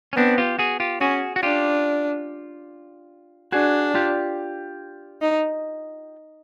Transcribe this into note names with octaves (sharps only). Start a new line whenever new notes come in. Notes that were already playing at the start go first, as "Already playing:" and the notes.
C#4
B3 C4 D4
F4 G4
F#4 G#4
F4 G4
C#4 F#4 G#4
F#4
D4 F4 G4
D4 F#4 G#4
F4 G4
D#4